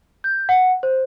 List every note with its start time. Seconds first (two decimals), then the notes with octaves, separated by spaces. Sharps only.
0.24 G6
0.49 F#5
0.83 C5